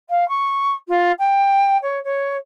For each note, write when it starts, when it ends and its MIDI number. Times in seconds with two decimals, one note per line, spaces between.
0.09 0.27 77
0.28 0.74 85
0.88 1.11 65
1.19 1.77 79
1.82 1.99 73
2.04 2.36 73